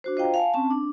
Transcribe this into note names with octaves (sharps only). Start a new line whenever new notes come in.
D4 F#4 C5
F4 C5 D#5 F5 G5 A#5
F5 G#5 A5
C4 C#4 A5
D4